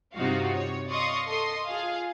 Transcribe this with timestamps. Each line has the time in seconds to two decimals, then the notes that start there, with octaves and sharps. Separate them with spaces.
0.14 G2 C3 D#4 F4 F#4 F5
0.53 C#5
0.89 D5 D#5 F5 C6 C#6 D#6
1.28 A4 D#5 C6 D#6
1.67 F4 G#4 F5